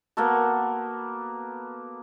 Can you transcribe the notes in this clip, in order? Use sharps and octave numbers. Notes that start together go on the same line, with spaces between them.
A#3 B3 F#4 A4